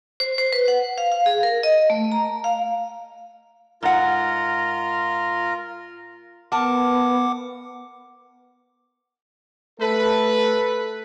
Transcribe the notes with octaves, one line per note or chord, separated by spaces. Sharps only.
C5
C5
B4
F#5
F5
F5
G#4
A#4
D#5
A3
A#5
F5
G#2 F4 A#4 F#5
B3 A#4 F#5 A5 D6
A3 A4 B4